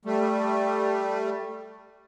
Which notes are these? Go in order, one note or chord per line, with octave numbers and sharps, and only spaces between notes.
G3 A3